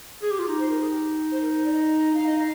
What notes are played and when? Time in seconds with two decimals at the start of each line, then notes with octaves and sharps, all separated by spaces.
0.22 G#4
0.31 G4
0.39 F4 G#4
0.48 D#4 G4
0.59 C5
0.69 A#4
0.80 G#4
0.90 G4
1.32 C5
1.41 A#4
1.53 C5
1.64 D5
1.73 D#5
2.14 D#4 F5
2.26 D#5
2.32 D#4
2.39 F5